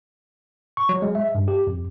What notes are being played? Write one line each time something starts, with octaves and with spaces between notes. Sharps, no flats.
C#6
F#3
G#3
E5
G2
G4
F2